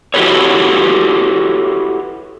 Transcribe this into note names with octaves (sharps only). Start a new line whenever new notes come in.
E4 F#4 G4 A4 B4 C#5